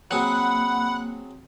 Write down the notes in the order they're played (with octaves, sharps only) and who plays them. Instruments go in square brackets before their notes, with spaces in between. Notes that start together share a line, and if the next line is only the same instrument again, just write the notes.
[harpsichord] F#3 C4 G#4 [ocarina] A#3 [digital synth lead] F#5 [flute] B5